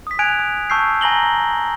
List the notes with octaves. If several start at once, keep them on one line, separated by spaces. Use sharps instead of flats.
D#6 B6
G#5 F#6 G#6 D7 F7
D#6
A5 C#6 E6 G6 C7
G#5 A#5 A#6 F#7 G7